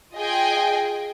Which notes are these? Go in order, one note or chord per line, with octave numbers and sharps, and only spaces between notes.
F4 G#4 D#5 G5 G#5